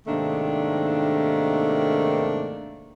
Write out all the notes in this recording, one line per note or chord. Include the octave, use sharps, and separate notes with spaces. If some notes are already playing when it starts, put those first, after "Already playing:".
G#2 C3 D#3 A3 A#3 D4